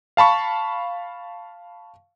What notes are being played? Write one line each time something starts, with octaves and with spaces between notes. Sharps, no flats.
F5 A5 B5 C#6